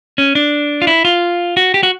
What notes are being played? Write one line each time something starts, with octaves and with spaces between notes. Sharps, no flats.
C#4
D4
F4
E4
F4
F#4
G4
F#4